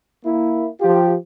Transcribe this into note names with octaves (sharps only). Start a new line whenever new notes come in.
A#3 E4
F3 F4 G4